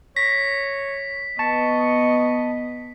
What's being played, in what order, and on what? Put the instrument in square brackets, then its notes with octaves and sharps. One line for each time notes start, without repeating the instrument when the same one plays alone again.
[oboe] C#5 [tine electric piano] A#6 [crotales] B6
[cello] B3 D#5 [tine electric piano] A5 [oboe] C#6